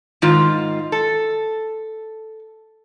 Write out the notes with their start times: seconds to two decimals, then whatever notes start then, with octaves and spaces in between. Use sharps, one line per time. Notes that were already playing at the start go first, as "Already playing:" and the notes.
0.22 G#2 D#3 F4
0.92 A4